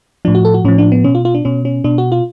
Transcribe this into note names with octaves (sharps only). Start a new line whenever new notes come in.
A2 F3 D4
F#4
A4
F#4
A2 F3 C#4
D4
B3
B2 C#4
F4
F4
D4
B2 C#4
C#4
B2 D4
F#4
F4